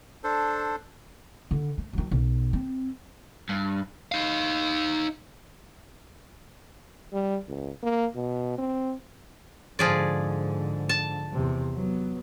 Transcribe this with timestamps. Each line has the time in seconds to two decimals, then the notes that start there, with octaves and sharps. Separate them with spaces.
0.24 D4 A4 C5
1.51 D3
1.78 A3
1.93 D#3 F#3
2.11 B1
2.53 C4
3.49 G2
4.12 D#4 F5
7.13 G3
7.48 C#2
7.83 A#3
8.16 B2
8.58 C4
9.79 G#2 D3 F3 G#4 D5
10.89 A5
11.33 E2 C3
11.75 F#3 B3